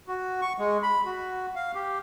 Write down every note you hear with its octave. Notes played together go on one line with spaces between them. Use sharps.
F#4
C#6
G#3
B5
F#4
F5
G4